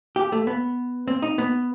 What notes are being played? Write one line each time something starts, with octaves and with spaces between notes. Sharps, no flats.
G4
A3
B3
C4
D#4
B3